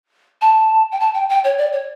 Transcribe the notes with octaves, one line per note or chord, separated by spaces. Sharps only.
A5
G5
A5
G5
G5
C#5
D5
C#5